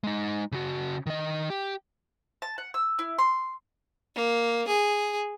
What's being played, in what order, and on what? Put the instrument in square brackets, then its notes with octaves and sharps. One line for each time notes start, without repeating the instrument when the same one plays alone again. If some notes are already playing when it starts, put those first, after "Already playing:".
[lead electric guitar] G#3 D#4
C#3 F#4
D#3 D#5
G4
[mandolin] A5
F#5
E6
E4
C6
[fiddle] A#3
G#4